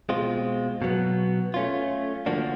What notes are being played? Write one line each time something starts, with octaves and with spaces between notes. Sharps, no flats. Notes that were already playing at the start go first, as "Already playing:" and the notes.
B2 G#3 C4 F4
B2 F#3 B3
A3 C#4 F4
D3 F3 A#3 D4 F#4